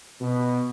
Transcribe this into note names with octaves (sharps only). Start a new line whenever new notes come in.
B2